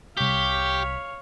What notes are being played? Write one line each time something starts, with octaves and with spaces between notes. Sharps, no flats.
C2 G4 C#5 F5 B6